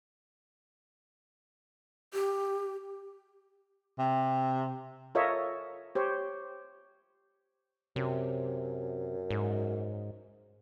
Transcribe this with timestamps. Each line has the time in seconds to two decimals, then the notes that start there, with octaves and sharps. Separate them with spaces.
2.13 G4
3.99 C3
5.15 F4 A4 A#4 C#5 D#5 E5
5.95 G4 C5 C#5
7.96 F#2 C3
9.30 G#2